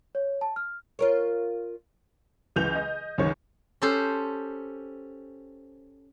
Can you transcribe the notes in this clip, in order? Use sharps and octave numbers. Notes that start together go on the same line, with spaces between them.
C#5
A5
F6
F4 A#4 C#5
C#2 E3 G6 F7
D#5
C#2 D#3 C#5
C#4 G4 A4 C5 A5